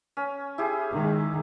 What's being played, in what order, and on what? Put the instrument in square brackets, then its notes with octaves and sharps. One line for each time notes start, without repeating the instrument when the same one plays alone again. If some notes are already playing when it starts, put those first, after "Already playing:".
[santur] C#4
E4 G4 G#4
[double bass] D#3 G#3